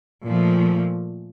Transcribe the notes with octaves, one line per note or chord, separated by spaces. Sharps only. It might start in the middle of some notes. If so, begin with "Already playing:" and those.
A#2 F3 A3